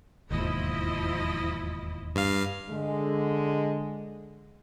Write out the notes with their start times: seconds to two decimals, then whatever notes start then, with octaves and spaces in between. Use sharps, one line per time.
0.31 E1 D#2 G#2 F3 E4 D#5
2.16 G2 F5
2.68 D3 G#3